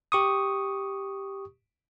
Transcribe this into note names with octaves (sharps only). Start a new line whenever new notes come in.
G4 C#6 D#6